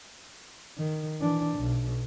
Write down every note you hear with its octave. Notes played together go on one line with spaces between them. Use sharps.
D#3
E3 D4
B1